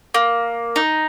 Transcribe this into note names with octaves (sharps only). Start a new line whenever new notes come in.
A#3
D#4